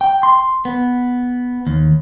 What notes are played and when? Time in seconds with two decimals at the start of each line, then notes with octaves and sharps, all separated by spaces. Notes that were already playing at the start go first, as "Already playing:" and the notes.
0.01 G5
0.23 C6
0.65 B3
1.67 D#2